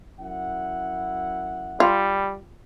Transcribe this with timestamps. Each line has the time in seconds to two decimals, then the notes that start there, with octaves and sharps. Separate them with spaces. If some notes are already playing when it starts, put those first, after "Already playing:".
0.20 F#2 E4 F#5
1.80 G3 F4